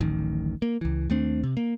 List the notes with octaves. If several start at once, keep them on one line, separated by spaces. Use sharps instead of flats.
D1 A1 D#3
A#3
C#2 E3
D#2 A3 C4 D4
C3
A#3